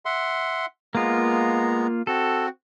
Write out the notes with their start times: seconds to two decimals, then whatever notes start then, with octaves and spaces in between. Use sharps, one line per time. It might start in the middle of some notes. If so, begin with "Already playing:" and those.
0.05 E5 F#5 C6
0.95 G#3 A#3 B3 F4 A#5
2.07 C4 F#4 A4